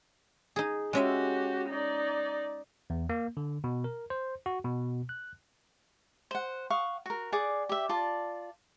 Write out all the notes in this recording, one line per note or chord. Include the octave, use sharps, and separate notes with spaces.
D#4 G#4
G#3 C#4 F#4 G4 E5
D#4 D5
E2
A#3
D3
B2
A#4
C5
F#4
B2
F#6
C5 F#5
F5 F#5 C#6 D#6
F#4 A#4
G#4 D5 F#5 D6
G4 E5
F4 D5 A5